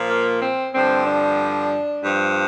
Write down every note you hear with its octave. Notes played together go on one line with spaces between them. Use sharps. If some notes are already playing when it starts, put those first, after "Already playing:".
Already playing: A#2 F3
A#3
C4
G2 D3 F3 C4
D4
G2 F3